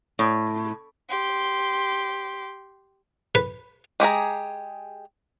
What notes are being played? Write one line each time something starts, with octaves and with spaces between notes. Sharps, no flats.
A2
G4 C6
B4
G#3 G4 G#4 A#5